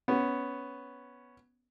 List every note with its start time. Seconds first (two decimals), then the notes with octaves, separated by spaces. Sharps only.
0.08 B3 C#4